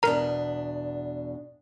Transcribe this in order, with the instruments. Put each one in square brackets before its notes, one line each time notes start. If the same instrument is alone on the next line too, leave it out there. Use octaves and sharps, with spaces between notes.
[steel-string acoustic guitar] E2 B2 D4 [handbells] A#4 A#5